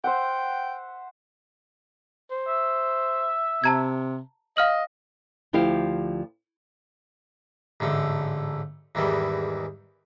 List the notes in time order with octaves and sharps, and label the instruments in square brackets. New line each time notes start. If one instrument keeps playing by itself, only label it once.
[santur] C5 E5 F#5 [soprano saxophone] G5
[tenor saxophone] C5
[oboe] E5
[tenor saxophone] C3 [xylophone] A5 A#5 G#6
[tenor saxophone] D#5 [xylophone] F5 F6 F#7
[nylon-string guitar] D2 F3 E4 G4 F5
[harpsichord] A1 G#2 D3 A3
E2 G#2 D#3 E3 G3